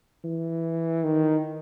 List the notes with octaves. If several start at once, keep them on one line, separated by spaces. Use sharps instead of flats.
E3
D#3